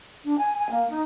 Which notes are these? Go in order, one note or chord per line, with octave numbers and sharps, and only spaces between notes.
D4
G#5
G#5
A#3
D#4